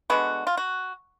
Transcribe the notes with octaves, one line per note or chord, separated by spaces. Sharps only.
D3 G#3 B3 F#4
F4
F#4